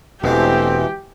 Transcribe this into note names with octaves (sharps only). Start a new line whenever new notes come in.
E1 B2 E3 G#3 A3 C4 G4